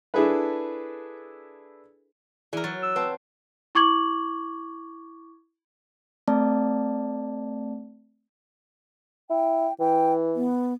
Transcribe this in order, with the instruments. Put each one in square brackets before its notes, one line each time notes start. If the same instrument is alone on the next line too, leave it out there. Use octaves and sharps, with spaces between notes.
[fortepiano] D4 E4 G#4 A4 B4
[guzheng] E3 A#4 [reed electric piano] E4 G#4 D5
[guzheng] F#3 [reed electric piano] A6
[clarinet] E6
[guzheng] C4 [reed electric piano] B4 F#5 A5
[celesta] E4 C#6 D6 G#6 F#7
[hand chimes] A3 C4 D5 A5
[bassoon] E4 [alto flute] G5
[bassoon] E3 [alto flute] G5
[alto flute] B3